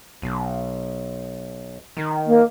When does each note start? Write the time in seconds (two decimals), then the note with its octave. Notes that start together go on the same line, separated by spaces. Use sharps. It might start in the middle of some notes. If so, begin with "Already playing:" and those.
0.22 B1
1.97 D#3
2.26 A#3